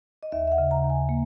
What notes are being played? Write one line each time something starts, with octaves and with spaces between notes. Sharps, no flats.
D#5
D#2 E5
E5
F#5
C#3
A#5
D#2
G#5
A#3